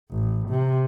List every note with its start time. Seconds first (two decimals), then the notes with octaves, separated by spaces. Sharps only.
0.11 A1
0.50 C3